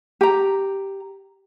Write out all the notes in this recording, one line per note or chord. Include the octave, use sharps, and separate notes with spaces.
G4 A#5